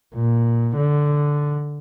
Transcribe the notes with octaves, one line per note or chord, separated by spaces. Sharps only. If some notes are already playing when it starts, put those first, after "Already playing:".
A#2
D3